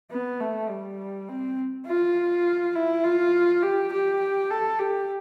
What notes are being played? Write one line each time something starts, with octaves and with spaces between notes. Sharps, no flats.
B3
A3
G3
C4
F4
E4
F4
G4
G4
A4
G4